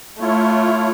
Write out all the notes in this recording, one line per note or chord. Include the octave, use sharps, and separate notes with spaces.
A3 E4 F4 C#5